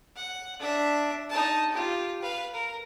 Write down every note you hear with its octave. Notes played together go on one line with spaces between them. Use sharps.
F#5
D4 E5
D#4 A5
F4 G4
B4 F5
A#4